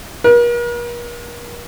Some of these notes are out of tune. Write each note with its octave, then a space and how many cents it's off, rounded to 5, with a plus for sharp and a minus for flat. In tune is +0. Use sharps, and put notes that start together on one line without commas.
A#4 +45